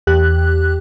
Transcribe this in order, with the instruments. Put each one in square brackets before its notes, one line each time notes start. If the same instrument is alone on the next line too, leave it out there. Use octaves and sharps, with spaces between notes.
[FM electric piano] E2 G4 F#6